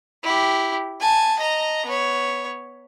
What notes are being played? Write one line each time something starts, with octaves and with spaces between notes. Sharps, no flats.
E4 G4
G#5 A5
D#5 A#5
B3 C#5